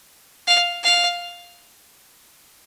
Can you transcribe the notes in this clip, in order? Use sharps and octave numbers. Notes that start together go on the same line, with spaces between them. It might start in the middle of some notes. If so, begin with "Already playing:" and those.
F5
F5